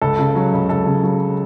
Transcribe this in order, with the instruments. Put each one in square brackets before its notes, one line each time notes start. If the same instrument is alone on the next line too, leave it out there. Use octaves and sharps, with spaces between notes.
[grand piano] C#2 A4
C#3
F#3
C#2
C#2 A4
C#3
F#3